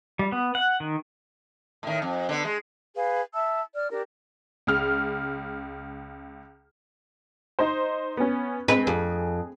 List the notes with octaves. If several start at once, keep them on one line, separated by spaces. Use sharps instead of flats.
G3
B3
F#5
D#3
A2 D#3
F2
D3 B3
G#3
G#4 B4 F5
E5 A5 E6
D5 F6
D4 G4 A#4
C#2 F6
D#4 C5
B3 C#4
G#3 C4 B4
F2 G#4